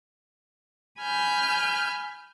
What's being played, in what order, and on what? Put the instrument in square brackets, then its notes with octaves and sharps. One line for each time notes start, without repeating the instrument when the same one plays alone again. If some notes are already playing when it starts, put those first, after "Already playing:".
[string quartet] G#5 B5 F6 G6